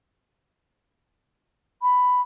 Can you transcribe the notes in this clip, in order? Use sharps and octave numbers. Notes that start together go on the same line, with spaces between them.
B5